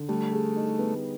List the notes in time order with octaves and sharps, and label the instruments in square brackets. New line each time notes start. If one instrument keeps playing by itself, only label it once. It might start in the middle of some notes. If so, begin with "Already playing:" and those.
Already playing: [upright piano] D3
[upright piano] G3 [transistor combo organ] A3
[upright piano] G#4
D#4
B3